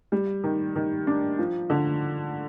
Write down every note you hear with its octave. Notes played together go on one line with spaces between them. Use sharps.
G3
D#3
D#3
D4
F3
D3